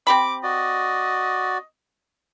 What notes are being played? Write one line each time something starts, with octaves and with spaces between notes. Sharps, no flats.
C4 G4 B5 D6
F#4 D5 D#5